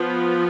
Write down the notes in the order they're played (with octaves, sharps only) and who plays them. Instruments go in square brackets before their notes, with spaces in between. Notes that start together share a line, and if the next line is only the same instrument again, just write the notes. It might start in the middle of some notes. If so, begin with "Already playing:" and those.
Already playing: [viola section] F3 B3